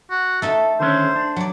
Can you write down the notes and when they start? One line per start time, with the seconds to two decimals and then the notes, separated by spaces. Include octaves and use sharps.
0.10 F#4
0.42 A3 D#4 A4 E5
0.80 D3 D#3 C#4 C5
1.16 D4
1.36 F#3 D5